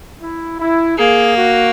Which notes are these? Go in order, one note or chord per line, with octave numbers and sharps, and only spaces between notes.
E4
E4
A#3 G#4
F#4